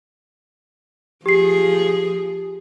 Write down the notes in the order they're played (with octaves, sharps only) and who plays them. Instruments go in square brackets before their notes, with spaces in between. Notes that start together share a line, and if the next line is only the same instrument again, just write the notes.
[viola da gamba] F3 G#4 [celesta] G4 C7